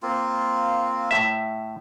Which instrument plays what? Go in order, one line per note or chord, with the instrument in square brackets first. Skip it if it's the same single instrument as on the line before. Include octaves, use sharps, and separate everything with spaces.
[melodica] A#3 C4 F4
[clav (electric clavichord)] A2 E5